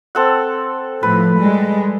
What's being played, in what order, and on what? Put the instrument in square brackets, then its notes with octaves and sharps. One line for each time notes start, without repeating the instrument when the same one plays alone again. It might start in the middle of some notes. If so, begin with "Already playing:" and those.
[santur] C4 A4 F#5
[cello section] A2 F3 [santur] B4
[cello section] G3 G#3